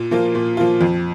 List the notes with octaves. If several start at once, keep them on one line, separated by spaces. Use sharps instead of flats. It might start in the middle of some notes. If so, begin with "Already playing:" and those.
Already playing: A#2
F3 A#3 F4
A#2
F3 A#3 F4
F2